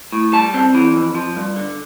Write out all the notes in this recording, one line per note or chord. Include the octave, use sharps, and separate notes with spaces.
A2
G3 A5
C4
E3
F2
F3
G2
D3